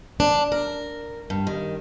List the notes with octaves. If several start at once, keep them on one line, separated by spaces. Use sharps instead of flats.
D4
A#4
G2
D#3